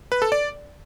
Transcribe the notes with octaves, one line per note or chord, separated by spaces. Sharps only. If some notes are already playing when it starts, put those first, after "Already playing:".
B4
A4
D5